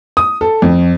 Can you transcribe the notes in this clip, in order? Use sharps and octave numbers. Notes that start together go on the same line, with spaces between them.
D#6
A4
F2